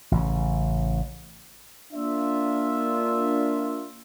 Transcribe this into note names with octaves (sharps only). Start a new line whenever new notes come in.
A1 C#3
A#3 D4 F4 E5